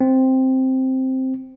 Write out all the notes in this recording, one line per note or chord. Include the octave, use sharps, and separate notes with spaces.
C4